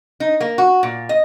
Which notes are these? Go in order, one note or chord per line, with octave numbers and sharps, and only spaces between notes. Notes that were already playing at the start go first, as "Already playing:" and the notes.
D#4
A#3
F#4
A#2
D#5